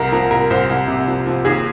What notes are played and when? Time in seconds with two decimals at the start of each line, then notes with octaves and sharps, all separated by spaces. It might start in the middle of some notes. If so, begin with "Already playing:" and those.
Already playing: C2 A#4
0.12 F3 A#4
0.31 C2 A#4
0.50 C2 C5
0.70 C2
0.88 C3
1.07 F3
1.27 F3
1.45 D#2 G#4